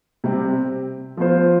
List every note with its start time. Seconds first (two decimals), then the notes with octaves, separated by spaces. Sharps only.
0.24 C3 G3 C4 G4
1.17 F3 B3 F4 C5